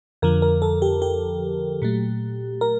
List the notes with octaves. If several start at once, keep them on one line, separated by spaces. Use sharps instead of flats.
F2 D3 F3 A#4
A#4
A4
G4
G4
A#2 F#3 A3
A#4